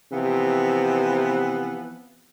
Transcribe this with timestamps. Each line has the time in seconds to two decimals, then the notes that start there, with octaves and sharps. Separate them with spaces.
0.12 C3 E3 F3 B3